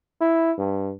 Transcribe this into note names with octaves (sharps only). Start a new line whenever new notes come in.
E4
G2